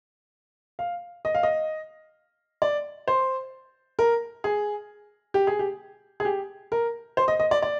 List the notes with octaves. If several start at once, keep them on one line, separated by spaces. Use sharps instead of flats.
F5
D#5
F5
D#5
D5
C5
A#4
G#4
G4
G#4
G4
G#4
G4
A#4
C5
D#5
D#5
D5
D5